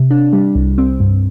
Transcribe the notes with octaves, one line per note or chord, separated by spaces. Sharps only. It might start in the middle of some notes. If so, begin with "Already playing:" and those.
Already playing: C3
D4
G3
C2
C4
G2